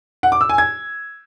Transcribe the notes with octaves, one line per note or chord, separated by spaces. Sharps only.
F#5
D6
E6
G#5
G#6